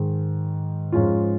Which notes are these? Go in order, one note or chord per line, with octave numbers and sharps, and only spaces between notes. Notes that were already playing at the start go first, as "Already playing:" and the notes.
Already playing: G#2 D#3 G#3
G#2 F3 G#3 C#4 F4